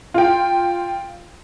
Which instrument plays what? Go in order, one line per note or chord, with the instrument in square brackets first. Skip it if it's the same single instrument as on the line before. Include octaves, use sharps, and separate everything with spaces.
[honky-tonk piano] F4 G5